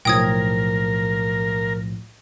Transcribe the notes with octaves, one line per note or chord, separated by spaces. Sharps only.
B1 A2 F3 A#4 G5 D#6 G#6